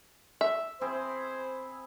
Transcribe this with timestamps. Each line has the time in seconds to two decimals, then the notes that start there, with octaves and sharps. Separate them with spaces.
0.41 E5
0.81 C4 E4 G#4 C5